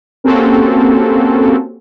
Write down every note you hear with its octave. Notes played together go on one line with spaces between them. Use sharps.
A#3 C4 C#4 F#4 G4 A4